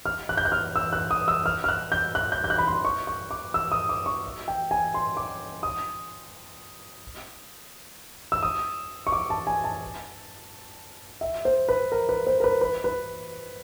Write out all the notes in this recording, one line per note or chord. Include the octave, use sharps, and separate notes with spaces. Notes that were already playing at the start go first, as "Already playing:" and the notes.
F6
F#6
G6
F#6
F6
E6
F#6
D#6
E6
F6
F6
F#6
G6
F#6
G6
G6
F#6
B5
C6
C#6
C#6
D6
E6
D#6
D6
C#6
G5
G#5
C6
D6
D#6
E6
D#6
C#6
D6
A5
G#5
A5
E5
C5
B4
A#4
B4
C5
A#4
B4
B4
B4